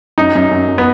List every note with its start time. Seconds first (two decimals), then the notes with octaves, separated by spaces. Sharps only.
0.18 F#2 D#4
0.35 F#2
0.51 F#2
0.68 F#2
0.78 B3